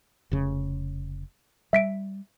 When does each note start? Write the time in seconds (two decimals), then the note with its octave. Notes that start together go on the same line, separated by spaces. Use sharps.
0.31 F1 C#3
1.73 G3 E5 B6 D7